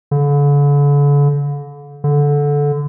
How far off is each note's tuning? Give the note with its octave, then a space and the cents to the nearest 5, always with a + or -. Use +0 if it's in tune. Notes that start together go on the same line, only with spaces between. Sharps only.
D3 -40
D3 -15